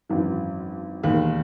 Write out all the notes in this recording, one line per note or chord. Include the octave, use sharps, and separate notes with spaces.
G#1 F#2 E3
E1 D#2 D#3